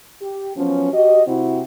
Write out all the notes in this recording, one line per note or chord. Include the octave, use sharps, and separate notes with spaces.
G4
F3 F#3 B3 C#4
F#4 G4 D#5
C3 C4 E4 F#4 G4